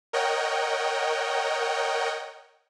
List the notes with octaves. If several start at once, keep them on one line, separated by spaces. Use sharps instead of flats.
A#4 C#5 D#5 F#5 G5